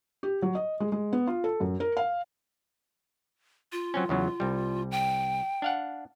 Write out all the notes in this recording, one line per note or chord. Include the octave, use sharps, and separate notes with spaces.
G4
F#3
D#5
G#3
G#3
B3
F4
A4
F#2
A#4
F5
F4
F#3 C4 C#4
E2 C#3 F#3
C2 G3
G5
D4 F5 F#5